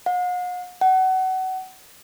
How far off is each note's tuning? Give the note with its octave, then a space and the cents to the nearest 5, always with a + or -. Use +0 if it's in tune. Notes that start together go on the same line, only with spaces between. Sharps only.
F#5 -45
F#5 +25